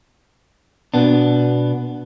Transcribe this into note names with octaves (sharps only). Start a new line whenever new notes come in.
B2 B3 D4